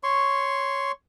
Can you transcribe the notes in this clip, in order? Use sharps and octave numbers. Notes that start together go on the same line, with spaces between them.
C#5 C6 C#6